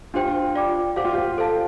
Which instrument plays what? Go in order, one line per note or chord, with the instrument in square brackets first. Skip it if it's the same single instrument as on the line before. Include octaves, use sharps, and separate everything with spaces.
[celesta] D4 G4 C5 G5 [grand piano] F4
[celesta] F4 D5 G5 D6
[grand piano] G4 [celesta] C5 F5 D6
[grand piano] F4
G4
[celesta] A4 C5 F5 A5